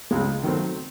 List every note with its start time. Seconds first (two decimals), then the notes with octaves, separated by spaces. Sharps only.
0.11 C#2 C#3 G#3
0.43 D#3 F#3 A3 C4